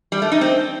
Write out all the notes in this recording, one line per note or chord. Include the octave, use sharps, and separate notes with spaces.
G3
A3
D#4
C4